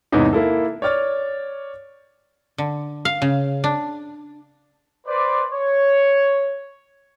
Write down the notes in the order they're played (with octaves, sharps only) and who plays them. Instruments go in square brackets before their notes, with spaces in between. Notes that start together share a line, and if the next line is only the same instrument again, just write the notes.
[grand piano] E2 G#2 C3 B3 C#4 D#4
A#3 E4 A4
C#5 D5 F6 A6
[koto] D3
F5
C#3
D4
[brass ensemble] B4 C5 D5
C#5